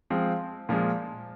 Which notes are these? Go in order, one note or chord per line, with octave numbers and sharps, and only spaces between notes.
F3 G#3 C4
A#2 F3 G#3